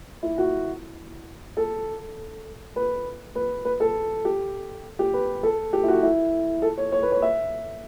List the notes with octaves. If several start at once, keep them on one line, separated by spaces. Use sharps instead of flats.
E4
F#4
A4
B4
B4
B4
A4
G4
G4
B4
A4
G4
E4
F#4
E4
A4
C#5
C#5
B4
C#5
E5